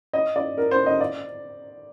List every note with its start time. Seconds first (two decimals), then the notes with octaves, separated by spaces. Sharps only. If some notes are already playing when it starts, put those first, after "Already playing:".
0.13 D#5
0.36 D5
0.58 A#4
0.71 C5
0.86 D#5
1.01 D5